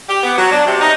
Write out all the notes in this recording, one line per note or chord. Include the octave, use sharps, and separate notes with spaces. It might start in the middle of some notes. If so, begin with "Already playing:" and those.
G4
B3
F#3
D4
C3
D#4